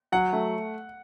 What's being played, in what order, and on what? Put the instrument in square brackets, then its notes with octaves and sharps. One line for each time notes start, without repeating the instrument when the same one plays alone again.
[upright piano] F#3 [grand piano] F#5
[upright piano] A3